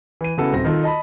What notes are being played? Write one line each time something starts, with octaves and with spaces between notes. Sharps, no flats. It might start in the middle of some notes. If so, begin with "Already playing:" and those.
E3 D#7
C#3 B3 E4 F#4 A4
D#1 C4 A#6
D#3 F4 A4
D#5 A5 B5